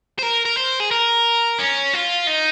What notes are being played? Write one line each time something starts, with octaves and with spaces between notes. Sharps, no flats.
C5
A#4
A#4
C5
G#4
A#4
C#4
F4
D#4